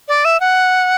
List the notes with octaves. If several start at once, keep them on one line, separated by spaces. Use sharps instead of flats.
D5
E5
F#5